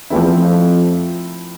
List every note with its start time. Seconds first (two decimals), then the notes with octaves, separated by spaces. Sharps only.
0.10 E2 F3 A3 C4 E4
0.38 F2